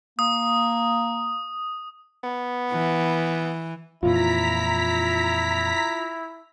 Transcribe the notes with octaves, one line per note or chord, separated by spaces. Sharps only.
A#3 D#6
B3
E3
F2 A#2 E3 E4 F4 A#5 B6